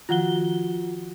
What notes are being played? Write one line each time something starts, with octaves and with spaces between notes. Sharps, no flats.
D#3 F3 F4 F#4 F#5 G7